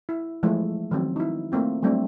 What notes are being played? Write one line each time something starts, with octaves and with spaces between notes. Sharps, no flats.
E4
E3 F3 G#3 A3 E4
D#3 F3 F#3 C4 C#4
D#4 E4
A3 A#3 C4 F4
F#3 G3 A3 C4 D4